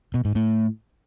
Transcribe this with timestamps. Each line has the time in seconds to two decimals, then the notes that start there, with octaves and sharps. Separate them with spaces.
0.14 B2
0.25 G#2
0.35 A2